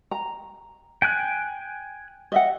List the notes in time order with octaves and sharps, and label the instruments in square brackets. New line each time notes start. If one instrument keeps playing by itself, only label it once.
[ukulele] A#5
[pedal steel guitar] G5 G#5 F#6
[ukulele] D#5 E5 F#5